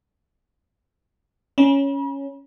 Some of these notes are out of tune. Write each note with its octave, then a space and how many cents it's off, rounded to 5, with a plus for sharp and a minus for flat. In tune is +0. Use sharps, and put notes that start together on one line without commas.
C#4 +0 B5 -45